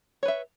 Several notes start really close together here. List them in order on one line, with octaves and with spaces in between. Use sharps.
C#5 B4 E5